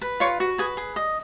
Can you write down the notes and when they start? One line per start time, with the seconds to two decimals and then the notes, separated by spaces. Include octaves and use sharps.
0.01 B4
0.20 F4 C#5 C#6
0.40 F#4
0.58 G#4 B4 G#5
0.77 G#4
0.96 D#5